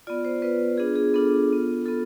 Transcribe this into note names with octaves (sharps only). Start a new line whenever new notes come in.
B3 F4 D5
C5
B3 F4 B4
B3 D4 F4 G#4
G#4
B3 D4 F4 A4
B3 F4
B3 F4 A4